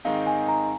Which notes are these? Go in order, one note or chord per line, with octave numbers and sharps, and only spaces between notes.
G#2 D#3 G#3 C4 D#4 F5
G#5
A#5